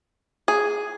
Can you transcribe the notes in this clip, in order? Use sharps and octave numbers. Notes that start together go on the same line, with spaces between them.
G#4